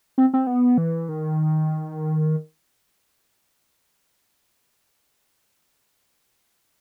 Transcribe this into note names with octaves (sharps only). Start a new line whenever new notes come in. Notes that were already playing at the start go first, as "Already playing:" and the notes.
C4
C4
B3
E3
D#3